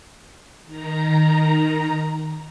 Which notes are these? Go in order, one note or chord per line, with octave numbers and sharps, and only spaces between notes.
D#3 A#5